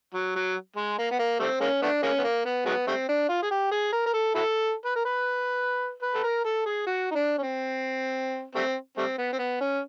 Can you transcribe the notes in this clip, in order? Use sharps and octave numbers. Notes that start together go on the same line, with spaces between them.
F#3
F#3
G#3
A#3
B3
A#3
G3 A3 C4
G#3 A#3 C#4
A3 B3 D4
G#3 A#3 C#4
B3
A#3
B3
F#3 G#3 B3
G3 A3 C4
D4
F4
G#4
G4
G#4
A#4
A#4
A4
E4 F#4 A4
B4
A#4
B4
B4
A4
A#4
A4
G#4
F#4
D#4
D4
C#4
C4
G3 A3 C4
G3 A3 C4
B3
C4
B3
C#4